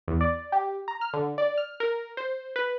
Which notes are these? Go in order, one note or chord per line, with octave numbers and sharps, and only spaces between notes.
E2
D5
G4
A#5
F6
D3
D5
F6
A#4
C5
B4